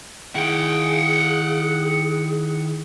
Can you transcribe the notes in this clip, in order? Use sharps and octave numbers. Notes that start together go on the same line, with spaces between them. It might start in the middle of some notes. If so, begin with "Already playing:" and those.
D#3 E4 G#4 F#5 G5